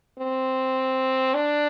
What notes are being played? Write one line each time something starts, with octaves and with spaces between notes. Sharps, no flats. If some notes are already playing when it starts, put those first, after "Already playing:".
C4
D4